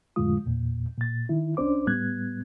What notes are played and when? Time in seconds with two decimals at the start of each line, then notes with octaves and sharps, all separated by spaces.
0.16 F2 A2 D3 G#3 F4 D#6
0.46 E2 A#2
0.97 A#2 A6
1.29 D#3 E4
1.57 C2 C#4 D4 C5 D6
1.86 A2 G3 B3 F#6 G#6